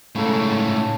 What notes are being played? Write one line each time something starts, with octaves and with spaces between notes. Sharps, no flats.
A2 C#3 F#3 G#3 A4